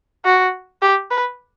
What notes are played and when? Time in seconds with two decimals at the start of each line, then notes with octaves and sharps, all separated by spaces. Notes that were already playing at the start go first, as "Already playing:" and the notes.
0.25 F#4
0.82 G4
1.11 B4